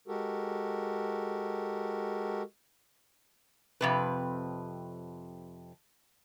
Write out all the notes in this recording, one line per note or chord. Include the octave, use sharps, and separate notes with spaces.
G#3 F#4 G4 A4 A#4
F2 C3 B4